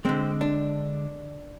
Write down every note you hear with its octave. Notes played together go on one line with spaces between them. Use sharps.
D3 G#3 C4
D4